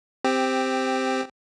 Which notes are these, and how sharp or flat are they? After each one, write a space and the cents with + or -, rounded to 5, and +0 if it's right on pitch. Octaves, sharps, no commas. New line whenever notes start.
C4 -5 G4 +10